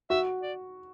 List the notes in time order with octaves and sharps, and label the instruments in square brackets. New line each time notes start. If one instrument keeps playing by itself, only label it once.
[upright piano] F#4 [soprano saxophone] E5
[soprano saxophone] D5